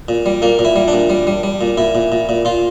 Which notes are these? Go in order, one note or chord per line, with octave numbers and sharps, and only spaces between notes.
A#2
G3
A#2 A#3
A#2
E4
G3
D4
A#2
G3
G3
G3
A#2
A#2 E4
A#2
A#2
A#2
A#2 F4